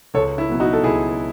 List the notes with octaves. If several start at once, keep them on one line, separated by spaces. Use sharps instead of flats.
C#2 A4 C#5
E4
B2 F#3 B3
D#4 F#4
A4
C#2 E4 G#4